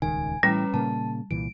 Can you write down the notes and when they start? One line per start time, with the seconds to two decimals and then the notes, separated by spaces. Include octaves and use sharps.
0.02 D#1 C#2 D#3 G#5
0.43 A2 E3 G3 C#4 B4 A#5
0.74 A#2 C#3 A#3 A5
1.31 C2 A#2 E3 D7